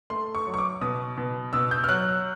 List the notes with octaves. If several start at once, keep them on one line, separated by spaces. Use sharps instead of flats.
A3 C6
C#6
F#3
C#6
D6
B2 D#6
B2
B2 E6
G6
F6
F#3 F#6